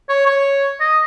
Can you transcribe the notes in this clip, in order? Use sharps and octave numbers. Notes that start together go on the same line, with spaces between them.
C#5
C#5
D#5